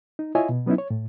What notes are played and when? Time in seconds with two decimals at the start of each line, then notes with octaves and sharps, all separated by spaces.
0.19 D#4
0.35 E4 F4 C#5 D#5 E5 G#5
0.49 B2
0.66 F#3 B3 C#4 D#4 E4
0.78 C#5
0.90 A2